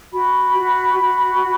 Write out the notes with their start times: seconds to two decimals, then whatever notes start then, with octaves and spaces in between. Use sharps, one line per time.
0.13 F#4 B5
0.57 F#4
1.00 F#4